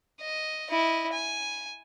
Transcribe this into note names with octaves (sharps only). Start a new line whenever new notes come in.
D#5
E4 D#5
G#5